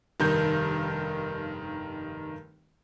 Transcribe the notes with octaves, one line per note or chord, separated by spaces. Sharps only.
F1 G2 D#3 A#4 G6